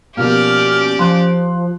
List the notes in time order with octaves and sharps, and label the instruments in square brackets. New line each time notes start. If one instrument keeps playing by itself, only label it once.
[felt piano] B2 F3 A#3 [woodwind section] C#4 [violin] G4 D5 [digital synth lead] F6
[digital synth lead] F3 [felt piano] C6 F#6